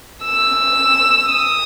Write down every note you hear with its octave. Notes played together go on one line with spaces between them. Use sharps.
E6
D#6